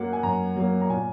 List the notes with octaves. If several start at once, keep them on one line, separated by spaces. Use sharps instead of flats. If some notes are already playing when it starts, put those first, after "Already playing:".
Already playing: F#2 F#3 A#3 F#5
G#5
F#2 A#5
F#3 A#3
A#5
A#2 G#5